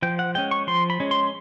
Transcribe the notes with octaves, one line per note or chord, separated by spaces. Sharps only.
F3 G5
F#5
G#3 C#4 G5
C#6
F3 C6
B5
G#3 C#4
C6